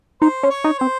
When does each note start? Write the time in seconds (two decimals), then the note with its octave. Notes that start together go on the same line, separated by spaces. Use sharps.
0.21 D#4 C5
0.43 C#4
0.50 C#5
0.64 D#4
0.79 C4 C5